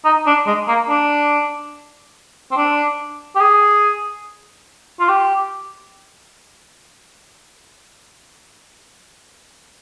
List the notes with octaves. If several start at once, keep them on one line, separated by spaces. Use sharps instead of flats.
D#4
D4
G#3
A#3
D4
C4
D4
G4
G#4
F4
G4